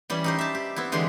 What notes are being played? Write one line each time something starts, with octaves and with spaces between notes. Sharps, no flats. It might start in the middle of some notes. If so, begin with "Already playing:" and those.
E3 G3 C#4
D#4 G4 C5
E5 A5
G4
B3 C4 E4
D3 E3 G#3 G4 C6